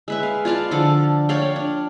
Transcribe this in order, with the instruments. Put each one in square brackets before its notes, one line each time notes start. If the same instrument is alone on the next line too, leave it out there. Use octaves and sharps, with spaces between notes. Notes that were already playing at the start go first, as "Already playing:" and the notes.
[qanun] G#3 B4 E5
F5
F4 D5 F5 A5
D3 F3 A4 D6
C#5 D5 F5 G5
D4